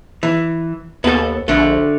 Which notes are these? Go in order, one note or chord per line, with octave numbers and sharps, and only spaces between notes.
E3
D#2 B3 A4
A#1 D3 A3